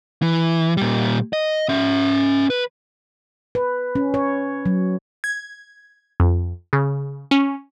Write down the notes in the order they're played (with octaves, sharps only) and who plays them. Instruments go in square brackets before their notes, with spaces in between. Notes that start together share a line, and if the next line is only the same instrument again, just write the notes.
[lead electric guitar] E3
A#2 G3
D#5
C#4 E5
B4
[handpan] B4
C#4
C#5
F#3
[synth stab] G#6
F2
C#3
C#4